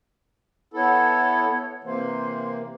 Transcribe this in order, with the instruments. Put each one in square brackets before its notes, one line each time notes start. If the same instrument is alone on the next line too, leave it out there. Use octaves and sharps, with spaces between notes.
[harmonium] B3 E4 A4 [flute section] C#5 F#5
[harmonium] C3 E3 A#3 [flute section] C5